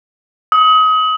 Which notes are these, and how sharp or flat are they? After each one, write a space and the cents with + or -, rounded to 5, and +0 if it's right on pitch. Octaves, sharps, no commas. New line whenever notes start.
D#6 +30